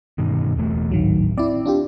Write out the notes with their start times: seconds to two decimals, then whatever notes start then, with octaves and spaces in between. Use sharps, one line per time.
0.18 G2 B2 D#3
0.56 E1 E2 A3
0.92 D1 G#1 D#3 F#3
1.38 C4 E4 D5
1.66 D4 F4 G4